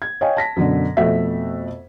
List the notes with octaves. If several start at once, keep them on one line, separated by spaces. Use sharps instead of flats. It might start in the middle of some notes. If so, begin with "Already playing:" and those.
G#6
C#5 D#5 F5 G5 G#5
A5 A#6 B6
F#2 B2 D3
F2 B2 A3 F#4 E5 B6